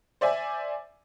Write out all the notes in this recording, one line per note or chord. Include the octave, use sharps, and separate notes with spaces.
C5 D5 E5 G#5